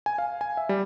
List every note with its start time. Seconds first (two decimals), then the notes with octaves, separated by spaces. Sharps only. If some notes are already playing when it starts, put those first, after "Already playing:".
0.06 G#5
0.18 F5
0.41 G#5
0.57 E5
0.69 G3